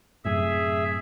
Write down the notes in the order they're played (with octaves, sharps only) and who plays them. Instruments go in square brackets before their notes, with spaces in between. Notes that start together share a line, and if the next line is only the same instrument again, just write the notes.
[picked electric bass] F#2 A2 C3 [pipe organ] G#4 E5